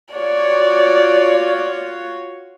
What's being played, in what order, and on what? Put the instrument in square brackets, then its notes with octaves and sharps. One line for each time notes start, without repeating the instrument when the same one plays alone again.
[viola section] F4 F#4 C#5 [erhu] D5